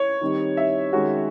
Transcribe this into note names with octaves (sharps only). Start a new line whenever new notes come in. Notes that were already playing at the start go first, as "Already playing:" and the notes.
Already playing: C#5
D#3 G3 C4 D#4
E5
D#3 G#3 C#4 F#4